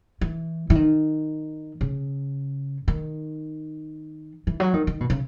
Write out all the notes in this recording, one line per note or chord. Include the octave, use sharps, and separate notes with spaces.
E3
E3
D#3
C#3
D#3
E3
F#3
D#3
D#3
B2
C#3